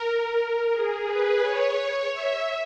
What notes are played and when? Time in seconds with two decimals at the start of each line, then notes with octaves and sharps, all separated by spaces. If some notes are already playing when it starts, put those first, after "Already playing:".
Already playing: A#4
0.72 G#4
1.07 B4
1.42 C#5
2.12 E5